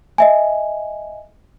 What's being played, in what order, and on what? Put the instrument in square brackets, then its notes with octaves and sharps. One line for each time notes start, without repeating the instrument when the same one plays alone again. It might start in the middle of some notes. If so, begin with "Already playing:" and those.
[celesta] D#5 E5 G#5